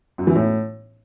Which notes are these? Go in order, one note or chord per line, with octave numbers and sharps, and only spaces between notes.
F#2
E3
A2